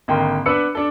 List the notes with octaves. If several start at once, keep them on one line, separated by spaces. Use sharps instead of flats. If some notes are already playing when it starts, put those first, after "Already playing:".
G#1 D3 A#3 G5 C6
B3 D4 B4 E6 C#7
D4 A4